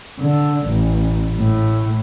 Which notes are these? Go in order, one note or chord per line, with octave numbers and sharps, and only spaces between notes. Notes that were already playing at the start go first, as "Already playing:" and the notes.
D3
A1
A2